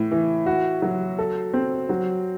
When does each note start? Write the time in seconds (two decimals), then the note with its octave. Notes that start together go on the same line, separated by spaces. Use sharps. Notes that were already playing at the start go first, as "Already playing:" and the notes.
Already playing: A2 E3
0.11 E3
0.46 F#4
0.82 F#3
1.19 A4
1.54 C4
1.89 F#3